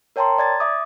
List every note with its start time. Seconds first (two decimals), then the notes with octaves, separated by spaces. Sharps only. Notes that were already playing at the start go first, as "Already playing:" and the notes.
0.16 A#4 C#5 G5 A5 A#5 C6
0.38 D5 G#6 A6
0.60 E5 D6 D#6